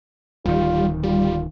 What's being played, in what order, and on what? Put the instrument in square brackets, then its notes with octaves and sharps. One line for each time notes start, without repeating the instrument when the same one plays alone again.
[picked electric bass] D1 D#3 [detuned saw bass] G3 [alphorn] F4
[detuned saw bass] G3 [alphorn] F4